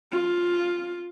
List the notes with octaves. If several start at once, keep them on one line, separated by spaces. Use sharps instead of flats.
F4